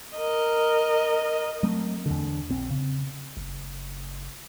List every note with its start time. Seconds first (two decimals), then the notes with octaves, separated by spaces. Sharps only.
0.16 A#4 D#5
1.63 F#3 A3 C4
2.06 E2 D3
2.50 A#1 C4
2.70 C#3
3.37 F#1